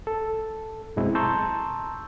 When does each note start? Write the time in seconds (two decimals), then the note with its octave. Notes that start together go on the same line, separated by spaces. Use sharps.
0.07 A4
0.96 F#2 B2 G#3 C4 E4
1.15 A5 A#5 C6 C#6 E6 G6